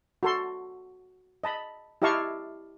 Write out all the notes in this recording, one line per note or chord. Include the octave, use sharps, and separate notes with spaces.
F#4 A4 C6
D#5 A5 B5
E4 G4 D#5 F5 A5 C#6